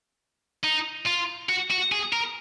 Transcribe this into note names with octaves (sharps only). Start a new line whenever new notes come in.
D#4
F4
F#4
F#4
G#4
A#4